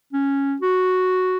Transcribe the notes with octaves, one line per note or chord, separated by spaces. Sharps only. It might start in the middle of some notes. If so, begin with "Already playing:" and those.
C#4
F#4